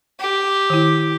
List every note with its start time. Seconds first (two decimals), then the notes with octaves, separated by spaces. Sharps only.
0.20 G4
0.70 D#3 E4